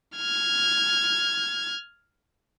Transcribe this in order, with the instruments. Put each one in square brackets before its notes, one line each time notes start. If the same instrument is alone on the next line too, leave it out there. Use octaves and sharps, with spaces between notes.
[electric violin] F6 G#6